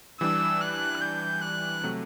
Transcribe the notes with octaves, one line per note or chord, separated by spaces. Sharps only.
E3 G3 D4 E6
F#6
G6
F#6
C3 F#3 A3